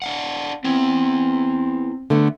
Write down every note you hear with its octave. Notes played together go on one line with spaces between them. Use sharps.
D4 F5 F#5
B3 C4 E4
D3 A3 B3